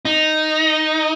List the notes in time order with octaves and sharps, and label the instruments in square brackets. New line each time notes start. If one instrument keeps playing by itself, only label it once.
[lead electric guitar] D#4